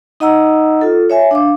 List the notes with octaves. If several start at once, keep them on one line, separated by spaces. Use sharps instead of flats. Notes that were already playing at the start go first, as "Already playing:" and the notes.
D#4 D#5 F#5 A#5 E6
F4 A4
C#5 E5 G#5
D4 F5 D6